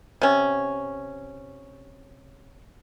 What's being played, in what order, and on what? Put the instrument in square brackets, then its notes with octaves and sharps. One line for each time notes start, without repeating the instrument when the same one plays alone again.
[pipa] C3 C#4